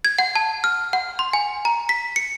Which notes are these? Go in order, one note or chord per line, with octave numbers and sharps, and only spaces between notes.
G#6
F#5
A5
F6
F#5
C6
G#5
A#5
B6
C#7